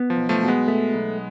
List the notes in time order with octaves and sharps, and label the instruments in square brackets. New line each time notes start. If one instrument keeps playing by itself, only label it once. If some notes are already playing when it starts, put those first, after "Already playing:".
Already playing: [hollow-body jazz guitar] B3
[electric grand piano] F3
[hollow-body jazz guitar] B1
[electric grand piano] F3 A3
[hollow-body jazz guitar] B2
[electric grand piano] G#3 B3
[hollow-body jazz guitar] A3
B1